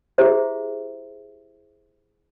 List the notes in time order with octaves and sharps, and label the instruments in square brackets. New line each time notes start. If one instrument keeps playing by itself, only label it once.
[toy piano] E4 G4 G#4 C5 E5